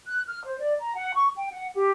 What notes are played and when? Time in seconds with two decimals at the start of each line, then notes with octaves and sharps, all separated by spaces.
0.08 F#6
0.28 F6
0.45 C5
0.59 D5
0.80 A#5
0.95 F#5
1.15 C#6
1.36 G5
1.51 F#5
1.74 G4